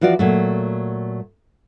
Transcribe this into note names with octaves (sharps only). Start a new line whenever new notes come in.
E3 F3 F4 F#4 D5
A#2 F#3 A3